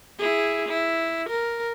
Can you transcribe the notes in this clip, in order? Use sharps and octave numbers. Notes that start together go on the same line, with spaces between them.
E4 G#4
E4
A#4